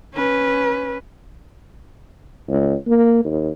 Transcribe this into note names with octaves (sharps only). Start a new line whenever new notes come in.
C#4 B4
C#2
A#3
D#2